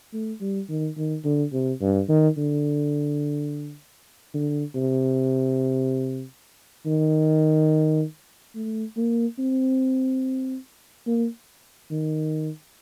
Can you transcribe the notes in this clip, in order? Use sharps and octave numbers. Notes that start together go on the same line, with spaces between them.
A3
G3
D#3
D#3
D3
C3
G2
D#3
D3
D3
C3
D#3
A3
A#3
C4
A#3
D#3